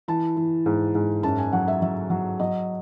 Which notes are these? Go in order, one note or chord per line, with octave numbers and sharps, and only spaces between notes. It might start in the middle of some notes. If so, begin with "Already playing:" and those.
E3 A5
E3
G#2
G#2
F#2 A5
G#5
F#3 F#5
E5
F#3 E5
F#3
F#3 D#5